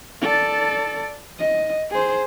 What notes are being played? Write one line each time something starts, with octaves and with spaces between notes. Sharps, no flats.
A4 D5
D#5
G#4 C5